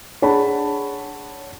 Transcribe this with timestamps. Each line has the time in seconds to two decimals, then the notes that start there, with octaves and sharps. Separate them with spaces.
0.22 D4 G#4 C#5 F#5 A5 B5